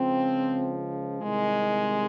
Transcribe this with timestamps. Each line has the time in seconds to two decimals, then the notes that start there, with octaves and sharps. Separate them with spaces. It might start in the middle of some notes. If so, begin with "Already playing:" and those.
Already playing: C#2 C#3 F3 C4
1.22 C2 C3 D#3 G#3